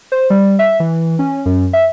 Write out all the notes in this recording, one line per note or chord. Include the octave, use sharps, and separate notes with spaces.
C5
G3
E5
E3
C#4
F#2
E5